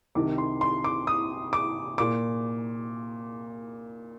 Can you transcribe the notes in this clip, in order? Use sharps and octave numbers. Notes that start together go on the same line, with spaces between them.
C2 C3 D#3 D6
C6
C6
D6
D#6
D6
A#2 D6